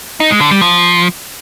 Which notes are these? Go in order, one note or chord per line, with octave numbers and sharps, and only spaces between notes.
D#4
G#3
D3
G3
F3